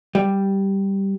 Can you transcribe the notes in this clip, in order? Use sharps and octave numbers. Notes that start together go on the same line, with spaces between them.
G3